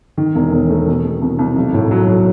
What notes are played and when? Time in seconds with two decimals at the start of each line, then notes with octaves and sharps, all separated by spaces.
0.17 D#3
0.35 E1
0.52 E1
0.69 A3
0.87 B2
1.05 A3
1.21 C2
1.39 C2
1.56 B1
1.74 A2
1.91 F#3
2.08 F#3